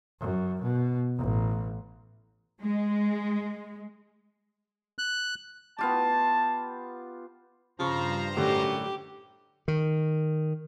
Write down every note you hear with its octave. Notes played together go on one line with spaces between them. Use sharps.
F#2
B2
A1
G#3
F#6
B3 F4 G4 A5
G2 C#3 F3 C5 A#5 C#6
F#2 A2 D3 G3 G4
D#3